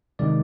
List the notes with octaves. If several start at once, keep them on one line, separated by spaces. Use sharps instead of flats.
C3 D#3 G#3 D5